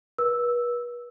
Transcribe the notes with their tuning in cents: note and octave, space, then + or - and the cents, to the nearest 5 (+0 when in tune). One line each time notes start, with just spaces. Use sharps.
B4 -40 E6 +0